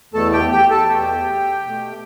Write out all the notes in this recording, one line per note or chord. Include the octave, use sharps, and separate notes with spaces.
E2 B2 A3 A4 A5
G4 G5
G4 G5
A4 A5
A5
E2 B2 A3 G4 G5
B2 A3